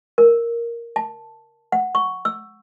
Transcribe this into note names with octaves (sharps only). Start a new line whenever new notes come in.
A#4
A5
F#5
C#6
E6